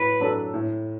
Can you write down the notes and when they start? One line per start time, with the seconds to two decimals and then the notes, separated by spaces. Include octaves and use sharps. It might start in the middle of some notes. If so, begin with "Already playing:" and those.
Already playing: A2 F#3 B4
0.20 F#3 D4 A4
0.54 A2